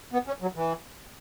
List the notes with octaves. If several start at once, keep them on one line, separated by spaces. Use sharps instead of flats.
B3
C#4
F#3
E3